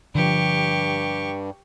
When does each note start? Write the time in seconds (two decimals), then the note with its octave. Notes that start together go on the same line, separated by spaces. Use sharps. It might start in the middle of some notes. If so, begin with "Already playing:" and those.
0.15 G2 D3 F3 G4 C#6